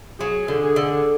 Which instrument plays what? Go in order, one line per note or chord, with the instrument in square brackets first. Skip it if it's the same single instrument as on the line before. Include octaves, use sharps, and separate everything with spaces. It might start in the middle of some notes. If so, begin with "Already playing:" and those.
[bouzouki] F#3 [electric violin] G#4
[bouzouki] D3
[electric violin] G#4
[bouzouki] D3